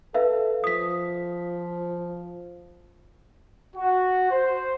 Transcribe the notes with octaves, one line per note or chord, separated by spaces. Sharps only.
A4 B4 E5 F5
F3 D#6 B6
F#4
C5